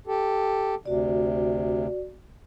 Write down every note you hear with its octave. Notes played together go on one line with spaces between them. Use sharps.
G4 A4
D2 C3 F#4 D5